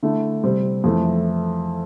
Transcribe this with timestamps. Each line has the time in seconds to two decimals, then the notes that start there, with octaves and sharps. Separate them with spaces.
0.03 D3 A3 E4
0.44 C3 G3 C4
0.84 F2 E3 A3 E4